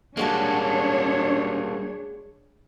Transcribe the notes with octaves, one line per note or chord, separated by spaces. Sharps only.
G3 G#3 A#3 D4 F#4 C#5 A5